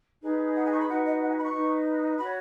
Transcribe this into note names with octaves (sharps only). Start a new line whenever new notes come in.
D#4 G#4 B4
F#5
G#5
C#6
B5
D#4 F#4 B4 F#5
D#5
F#5
G#5
B5
C#6
D#4 B4
F#4 C#5 B5